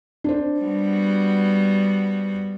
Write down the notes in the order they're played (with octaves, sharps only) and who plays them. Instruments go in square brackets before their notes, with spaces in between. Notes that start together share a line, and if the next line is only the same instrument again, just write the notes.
[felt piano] D4 C5
[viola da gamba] G3 B3 F#4